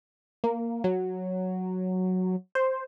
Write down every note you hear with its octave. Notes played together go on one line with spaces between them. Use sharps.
A#3
F#3
C5